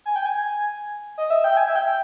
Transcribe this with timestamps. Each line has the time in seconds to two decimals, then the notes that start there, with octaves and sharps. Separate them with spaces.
0.06 G#5
0.16 G5
0.25 G#5
1.18 D#5
1.30 E5
1.44 G5
1.57 G#5
1.68 E5
1.76 G5
1.87 G5